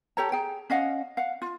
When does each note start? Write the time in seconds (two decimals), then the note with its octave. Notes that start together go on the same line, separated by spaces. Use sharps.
0.17 G4 A4 C#5 A#5
0.32 G#4 G5
0.70 C#4 D#5 F5 F#5
1.17 F5 F#5
1.42 F4